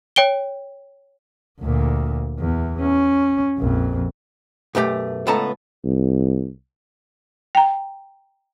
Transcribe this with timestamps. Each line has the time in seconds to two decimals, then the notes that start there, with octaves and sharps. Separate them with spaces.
0.16 C#5 G5 D7 G7
1.61 D2 A#2
2.39 E2
2.81 C#4
3.58 A#1 F2
4.75 B1 F#2 A3 G4
5.27 C#2 A2 B3 A4 A5 A#5
5.84 C2
7.55 G5 A#5